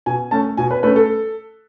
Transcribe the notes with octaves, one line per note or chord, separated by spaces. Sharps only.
B2 G#5
A3 C#4 A5
B2 G#5
B4
A3 C#4 B4
A4